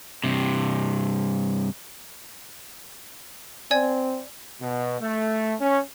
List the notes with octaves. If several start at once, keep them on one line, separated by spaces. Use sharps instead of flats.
G2 C3
C4 D5 G#5 G#6
B2
A3
C#4